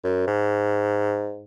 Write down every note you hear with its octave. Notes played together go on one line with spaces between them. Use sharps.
F#2
G#2